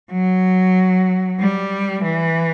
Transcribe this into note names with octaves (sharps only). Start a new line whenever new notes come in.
F#3
G3
E3